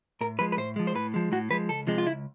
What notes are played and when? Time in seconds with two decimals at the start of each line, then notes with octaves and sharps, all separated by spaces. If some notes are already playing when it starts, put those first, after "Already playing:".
0.21 A2 A#4
0.39 F3 G#3 B4
0.52 B4
0.57 A2 C5
0.76 F3 G#3
0.87 C5
0.95 A2 B4
1.14 F3 G#3
1.32 A2 F#4
1.51 F3 G#3 B4
1.69 C#2 A4
1.87 C3 F3 G#3
1.98 F4
2.06 C#2 E4